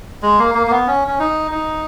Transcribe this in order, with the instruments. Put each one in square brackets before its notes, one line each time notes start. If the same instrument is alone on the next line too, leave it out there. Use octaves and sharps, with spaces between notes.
[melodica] G#3
A#3
A#3
A#3
B3
C#4
C#4
D#4
D#4